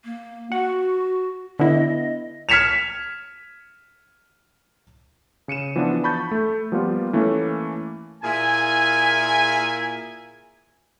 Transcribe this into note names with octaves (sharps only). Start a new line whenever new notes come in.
A#3
F#4 F#5
D3 B3 E4 D#5
F6 G#6 B6 C#7 E7 F7
C#3 C#7 D#7 E7
E3 F3 B3 D4
A5 B5 C#6 G6 A6
A3
F3 G3 A#3 B3 F4
E3 A3 A#3 C#4
A#2 E4 G#4 G#5